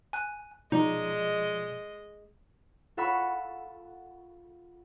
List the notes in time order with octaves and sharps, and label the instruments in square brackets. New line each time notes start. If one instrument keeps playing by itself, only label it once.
[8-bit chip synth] G#5 F#6
[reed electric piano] B2 F3 D5 [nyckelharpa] G#3 D#5 [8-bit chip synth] D#4
[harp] F4 A4 F5 F#5 B5 C#6